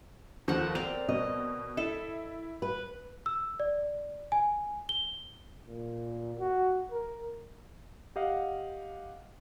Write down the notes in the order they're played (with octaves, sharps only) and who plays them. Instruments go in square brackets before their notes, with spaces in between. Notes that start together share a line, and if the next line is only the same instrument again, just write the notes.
[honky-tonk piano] D#2 F3 [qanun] A4 A#4 F#5
[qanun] C4 A#4 D5 [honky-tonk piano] F7
[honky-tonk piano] B2 [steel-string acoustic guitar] D#5
[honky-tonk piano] E4 [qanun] A4
[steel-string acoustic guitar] B4
[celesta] E6
D5
G#5
G7
[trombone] A#2
F#4
A#4
[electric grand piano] G4 D#5 F5 F#5